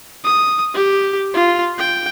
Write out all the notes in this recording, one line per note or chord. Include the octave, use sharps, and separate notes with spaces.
D#6
G4
F4
G5